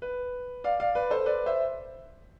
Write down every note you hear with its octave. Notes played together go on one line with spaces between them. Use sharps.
B4
D5 F5
D5 F5
B4 D5
A4 C5
B4 D5
C5 E5